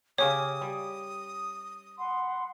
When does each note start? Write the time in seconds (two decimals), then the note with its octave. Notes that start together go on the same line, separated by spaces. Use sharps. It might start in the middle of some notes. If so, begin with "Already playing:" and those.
0.18 C#3 C#4 G4 C#5 D#6
0.61 G3
1.99 F#5 B5 C6